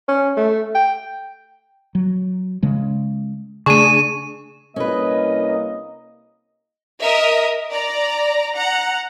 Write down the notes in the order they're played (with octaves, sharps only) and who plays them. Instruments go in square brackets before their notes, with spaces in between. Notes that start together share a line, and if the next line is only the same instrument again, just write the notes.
[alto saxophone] C#4
A3
G5
[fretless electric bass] F#3
C#3 G#3
[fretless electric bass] C#3 A3 [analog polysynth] D4 G#4 [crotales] C#6 D#7
[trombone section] C2 A#3 [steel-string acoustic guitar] C#4 B4 [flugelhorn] D#5
[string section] A#4 D#5 E5 D#6
D5 A#5
F#5 A#5